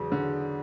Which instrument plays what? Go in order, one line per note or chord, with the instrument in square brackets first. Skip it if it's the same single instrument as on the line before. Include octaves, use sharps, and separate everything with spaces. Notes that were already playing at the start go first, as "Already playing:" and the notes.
Already playing: [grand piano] E2 F#3 [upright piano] C#3
[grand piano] D3